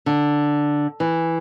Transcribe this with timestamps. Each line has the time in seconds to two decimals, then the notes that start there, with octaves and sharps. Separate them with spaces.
0.06 D3
1.00 E3